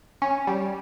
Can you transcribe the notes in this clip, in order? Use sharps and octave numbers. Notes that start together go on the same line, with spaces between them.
C#4
G3